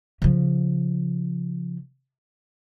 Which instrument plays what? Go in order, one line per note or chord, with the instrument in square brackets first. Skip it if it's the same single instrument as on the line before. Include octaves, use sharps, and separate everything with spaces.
[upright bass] C#3 F3